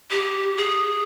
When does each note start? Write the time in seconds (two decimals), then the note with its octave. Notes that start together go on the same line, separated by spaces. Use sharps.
0.11 G4
0.57 G#4